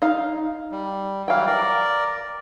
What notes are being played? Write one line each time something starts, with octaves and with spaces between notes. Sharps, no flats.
D#4 F5
G3
E3 F#3 G3 F5 G5
A#4 D5